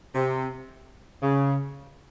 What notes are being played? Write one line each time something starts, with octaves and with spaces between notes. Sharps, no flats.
C3
C#3